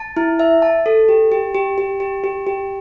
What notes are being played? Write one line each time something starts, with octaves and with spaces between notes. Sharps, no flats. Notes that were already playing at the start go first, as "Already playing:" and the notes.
Already playing: A5
E4
E5
A5
A4
G4
G4
G4
G4
G4
G4
G4